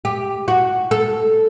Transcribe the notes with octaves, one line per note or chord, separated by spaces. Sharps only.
G4
F#4
A4